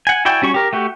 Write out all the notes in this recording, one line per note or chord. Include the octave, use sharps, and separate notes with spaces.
F#5 G#5
E4 F#4 D5 G5 G#5
G3 C#4 F#4 C#6
G4 A#4
A3 F#4 G4